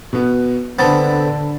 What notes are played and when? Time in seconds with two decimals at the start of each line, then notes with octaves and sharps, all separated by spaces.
0.13 B2 B3
0.79 D3 B3 C4 A5 B5 A6